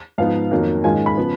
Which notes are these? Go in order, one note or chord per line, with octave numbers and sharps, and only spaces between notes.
G#2 F3 B3 D#4 F5
F2 D#3 F#3 A#3
G#2 D#3 G#3 C#4 F4 G#5
B5
C#3 F3 B3